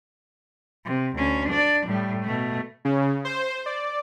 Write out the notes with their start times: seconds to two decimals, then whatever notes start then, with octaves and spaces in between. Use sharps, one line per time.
0.85 C3
1.17 D2 C#4
1.49 D4 D5
1.87 A2 G3
2.26 B2 A3
2.85 C#3
3.25 C5
3.66 D5